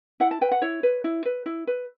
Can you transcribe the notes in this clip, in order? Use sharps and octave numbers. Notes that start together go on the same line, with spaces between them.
E4 F#5
A5
B4 G5
F#5
E4 C#5
B4
E4
B4
E4
B4